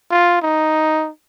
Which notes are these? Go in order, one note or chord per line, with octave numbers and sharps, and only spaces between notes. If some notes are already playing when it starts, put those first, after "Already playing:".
F4
D#4